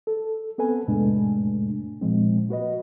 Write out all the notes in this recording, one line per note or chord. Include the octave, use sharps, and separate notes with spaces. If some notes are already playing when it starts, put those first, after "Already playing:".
A4
B3 C4 A4 B4 G#5
F2 A2 C3 G#3 A3 D4
A#2 F3 G#3 C4
A#3 F#4 B4 D#5